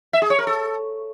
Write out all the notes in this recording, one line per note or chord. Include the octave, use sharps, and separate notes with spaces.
E5
G#4
C#5
A#4
A4